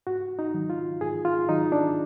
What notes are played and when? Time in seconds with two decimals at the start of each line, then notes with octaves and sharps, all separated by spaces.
0.07 G#2 F#4
0.39 D#4
0.54 D#3 F#3
0.70 F4
1.01 G#2 G#4
1.25 F4
1.49 D#3 F#3 D#4
1.72 D4